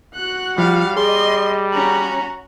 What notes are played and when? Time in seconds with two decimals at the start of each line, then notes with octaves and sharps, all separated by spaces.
0.15 F#4 F#5 F#6
0.58 F3 G3 F4 F5
0.97 G#4 D5 D#5 C6
1.74 C#4 F#4 A#5